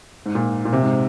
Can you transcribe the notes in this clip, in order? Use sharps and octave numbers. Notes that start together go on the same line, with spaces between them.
G#2
A#2
A#2
C3
G#2